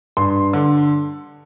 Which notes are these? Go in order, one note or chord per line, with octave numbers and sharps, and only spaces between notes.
G2 C6
D3